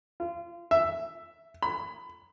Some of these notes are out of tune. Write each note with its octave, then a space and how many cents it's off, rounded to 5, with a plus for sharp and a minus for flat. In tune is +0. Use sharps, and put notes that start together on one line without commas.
F4 -30
E5 +5
B5 +25